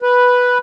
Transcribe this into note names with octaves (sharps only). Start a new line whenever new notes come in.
B4